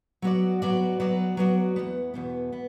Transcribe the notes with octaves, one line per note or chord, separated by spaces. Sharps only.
F#3 B3 F#4 D5
F#3 B3 F#4 D5
F#3 B3 F#4 D5
F#3 B3 F#4 D5
E2 B2 B3
E2 B2 B3
B3